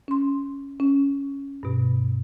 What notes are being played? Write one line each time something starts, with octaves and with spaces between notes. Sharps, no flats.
C#4 C6
C#4
G2 B2